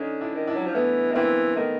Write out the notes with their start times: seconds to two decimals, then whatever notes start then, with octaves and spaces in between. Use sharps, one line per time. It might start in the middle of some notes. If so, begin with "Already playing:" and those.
Already playing: D3 C#4 D#4
0.21 D4 E4
0.34 D#3
0.47 D4 E4
0.55 F#3
0.66 F3
0.74 E3 A3 B3
1.11 D#3
1.15 E3 A#3 C4
1.56 D#3 A3 B3